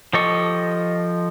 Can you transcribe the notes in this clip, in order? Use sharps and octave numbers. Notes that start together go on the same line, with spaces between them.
F3 G4 A4 D#5 C#6